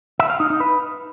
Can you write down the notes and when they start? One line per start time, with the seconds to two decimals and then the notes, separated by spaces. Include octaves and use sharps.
0.19 E5
0.30 F5
0.40 D#4
0.50 D#4
0.60 B4